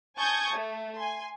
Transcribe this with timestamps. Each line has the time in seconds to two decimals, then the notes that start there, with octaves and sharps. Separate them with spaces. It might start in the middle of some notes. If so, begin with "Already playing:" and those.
0.18 G#5 A5 C#6 D#6 G6 G#6
0.54 A3
0.95 G#5 C6